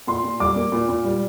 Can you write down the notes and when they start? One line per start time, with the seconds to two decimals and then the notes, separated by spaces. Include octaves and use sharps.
0.07 A#2 C6
0.24 A#2
0.40 G3 D6
0.56 A#3
0.72 A#2
0.89 A#2
1.04 G3